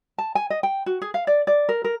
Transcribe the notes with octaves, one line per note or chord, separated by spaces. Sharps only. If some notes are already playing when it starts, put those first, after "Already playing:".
A5
G#5
D#5
G5
F#4
G#4
F5
D5
D5
A#4
A#4